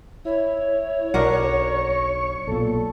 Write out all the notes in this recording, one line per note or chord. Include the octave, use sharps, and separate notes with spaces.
E4 C#5
B1 D4 A#4 F#5 C#6
B1 A#2 A4